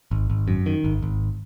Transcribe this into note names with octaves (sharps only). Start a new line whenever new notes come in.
G#1
G#1
F#2
D#3
G#1
G#1